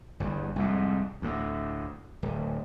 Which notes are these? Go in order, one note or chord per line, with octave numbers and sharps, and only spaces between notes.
G1 E2
C2 F2 G#2
D2 A2
D1